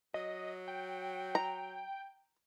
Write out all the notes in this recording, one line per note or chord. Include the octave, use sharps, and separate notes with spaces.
F#3 D#5
G5
A#5